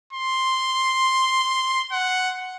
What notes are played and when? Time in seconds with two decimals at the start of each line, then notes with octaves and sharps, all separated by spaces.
0.13 C6
1.92 F#5